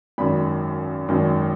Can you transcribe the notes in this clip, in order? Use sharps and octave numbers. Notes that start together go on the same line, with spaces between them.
G#1 F#2 D#3 B5
G#1 F#2 D#3